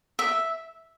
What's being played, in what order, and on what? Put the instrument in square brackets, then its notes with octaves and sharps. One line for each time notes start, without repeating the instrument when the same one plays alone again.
[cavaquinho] E5